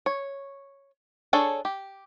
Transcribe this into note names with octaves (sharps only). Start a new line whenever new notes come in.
C#5
D4 G#4 A4 C#5
G4